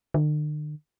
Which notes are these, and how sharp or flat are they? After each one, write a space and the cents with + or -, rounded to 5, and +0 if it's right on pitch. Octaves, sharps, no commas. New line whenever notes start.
D3 +45